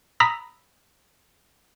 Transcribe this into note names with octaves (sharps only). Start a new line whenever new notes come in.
A#5 B5 D#6 E6 A#6 B6